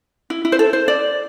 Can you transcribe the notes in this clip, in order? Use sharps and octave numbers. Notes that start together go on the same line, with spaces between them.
E4
E4
C5
A4
C5
D5